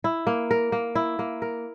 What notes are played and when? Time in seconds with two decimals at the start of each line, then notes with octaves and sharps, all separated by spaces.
0.04 E4
0.27 A#3
0.51 A#4
0.72 A#3
0.95 E4
1.19 A#3
1.42 A#4